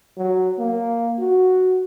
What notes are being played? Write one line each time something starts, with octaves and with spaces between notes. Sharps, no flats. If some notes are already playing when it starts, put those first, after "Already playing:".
F#3
A#3
F#4